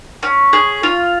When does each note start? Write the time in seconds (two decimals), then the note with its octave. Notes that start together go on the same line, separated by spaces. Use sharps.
0.23 C#4
0.53 G#4
0.83 F4